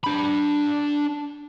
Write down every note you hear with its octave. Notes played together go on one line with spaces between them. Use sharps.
D4 B5